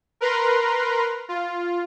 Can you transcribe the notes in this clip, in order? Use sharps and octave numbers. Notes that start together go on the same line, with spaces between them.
A#4 B4 A#5 C6
F4